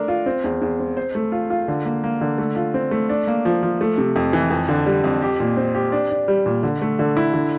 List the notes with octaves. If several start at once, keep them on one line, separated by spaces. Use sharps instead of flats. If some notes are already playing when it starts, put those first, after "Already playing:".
Already playing: A3 D4 A#4
F4
C4
E2
E2
C4
C5
A3
F4
F4
D3
A#3
A#3
D3
A3
F4
C4
A3
D4
A#3
F3
F3
A3
C3
F2
E3
F2
D3
G3
F2
G4
A#2
C4
G4
D4
D4
G3
A#2
D3
A3
D3
E4
D3